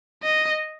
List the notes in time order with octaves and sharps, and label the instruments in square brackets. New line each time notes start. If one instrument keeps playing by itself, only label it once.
[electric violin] D#5